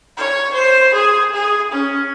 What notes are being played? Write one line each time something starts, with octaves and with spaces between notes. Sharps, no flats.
C#5
C5
G#4
G#4
C#4